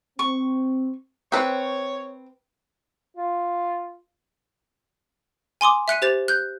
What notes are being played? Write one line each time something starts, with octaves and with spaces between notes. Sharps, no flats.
C4 C#6
C4 B4 C#5
F4
G#5 C6 D6 D#6
E5 F#6 C#7 D#7
G4 C5 A6 F7
F#6 G6